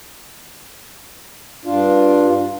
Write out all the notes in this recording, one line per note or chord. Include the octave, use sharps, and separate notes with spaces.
G2 D4 F4